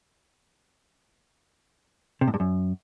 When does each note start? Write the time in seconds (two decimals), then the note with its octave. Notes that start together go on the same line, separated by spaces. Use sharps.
2.21 C3
2.28 A2
2.34 G2
2.40 F#2